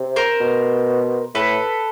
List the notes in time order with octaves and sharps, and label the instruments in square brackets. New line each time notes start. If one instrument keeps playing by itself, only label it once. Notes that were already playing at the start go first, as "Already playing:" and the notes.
Already playing: [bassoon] C3
[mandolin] A#4 C5
[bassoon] B2
[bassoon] A2 [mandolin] A4 B4